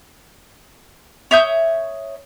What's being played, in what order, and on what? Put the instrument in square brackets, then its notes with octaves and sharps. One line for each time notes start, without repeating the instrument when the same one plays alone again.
[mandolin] C#5 E5 D#6 G6